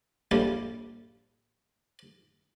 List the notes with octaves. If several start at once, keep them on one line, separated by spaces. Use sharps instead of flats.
A#1 A2 G3 F4